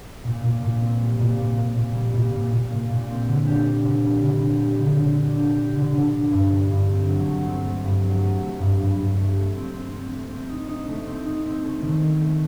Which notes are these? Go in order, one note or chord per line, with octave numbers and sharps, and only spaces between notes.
A#2
A#2
A#2
C4
G3
A#2
A#2
A#2
A#2
G3
A#2
A#2
A#2
A#2
A#2
C4
D3
G4
D4
D3
G3
D3
G3
G4
D3
D3
D4
G4
G4
D3
D3
D4
G2
A3
G2
C4
F#3
A3
C4
A3
G2
F#3
A3
A3
G2
G2
G2
A3
A3
C4
C4
C4
A3
C4
D#4
D#4
A3
C4
D#4
C4
A3
D#3
C4
A3